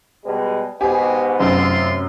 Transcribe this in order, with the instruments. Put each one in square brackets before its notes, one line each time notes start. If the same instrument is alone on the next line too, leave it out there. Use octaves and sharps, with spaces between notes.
[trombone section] B2 G3 G#3
[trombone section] G#2 B2 [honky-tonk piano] G4 G#5 [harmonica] G#4
[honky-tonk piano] F1 [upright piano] F#2 [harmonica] C4 F4 C6